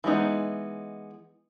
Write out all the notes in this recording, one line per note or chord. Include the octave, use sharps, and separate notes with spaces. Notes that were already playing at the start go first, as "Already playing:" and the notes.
E3 G#3 B3 D#4